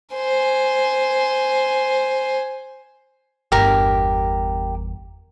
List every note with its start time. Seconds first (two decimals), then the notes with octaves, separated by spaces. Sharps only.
0.15 C5 G#5
3.52 G1 E2 G4 A#4